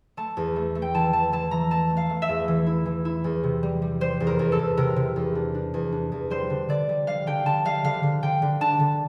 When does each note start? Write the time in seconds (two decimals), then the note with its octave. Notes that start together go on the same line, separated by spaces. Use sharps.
0.17 A3 A5
0.37 E2
0.56 A3
0.75 A3
0.82 G5
0.94 E3 A5
1.13 E3 A5
1.32 E3 A5
1.51 E3 A#5
1.71 A3 A5
1.90 A3
1.97 F5
2.10 A3
2.22 E5
2.29 E2
2.48 E3
2.67 E4
2.85 E3
3.05 E4
3.24 E2
3.43 C3
3.63 G3
3.82 G3
4.01 G3 C5
4.20 E2
4.27 A#4
4.39 E2
4.52 A4
4.59 E2
4.77 C3 A#4
4.96 C3
5.16 E2
5.35 D4
5.54 D4
5.74 E2
5.92 D4
6.12 E2
6.30 G3 C5
6.50 D3
6.69 D3 D5
6.89 G3
7.07 G3 F5
7.27 D3 G5
7.45 D3 A5
7.65 G3 F5
7.84 D3 F5
8.03 D3
8.23 D3 G5
8.42 D3
8.61 D4 A5
8.80 D3